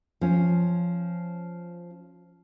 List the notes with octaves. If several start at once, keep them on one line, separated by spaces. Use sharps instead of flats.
F3 C#4